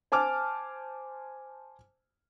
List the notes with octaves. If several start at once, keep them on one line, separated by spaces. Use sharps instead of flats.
C5 G#5 A5 D6 F6